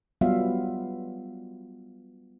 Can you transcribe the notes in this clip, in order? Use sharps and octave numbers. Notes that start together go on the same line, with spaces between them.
F#3 G3 B3 F4 E5 F5